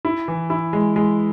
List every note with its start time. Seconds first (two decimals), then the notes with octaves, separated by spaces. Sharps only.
0.05 E4
0.28 E3
0.50 E4
0.73 G#3
0.96 G#3